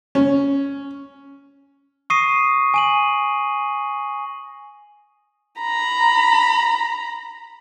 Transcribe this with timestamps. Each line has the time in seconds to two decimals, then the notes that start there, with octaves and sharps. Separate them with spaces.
0.15 C#4
2.10 C#6 D#6 A#6 C7 D#7
2.74 G#5 D#7 F#7
5.60 A#5 B5